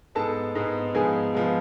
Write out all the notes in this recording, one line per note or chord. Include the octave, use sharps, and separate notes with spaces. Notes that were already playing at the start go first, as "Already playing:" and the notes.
G#2 G#3 B3 A4 A5
G#2 G#3 B3
G#2 F3 G#3 B3 G#4 G#5
F3 G#3 B3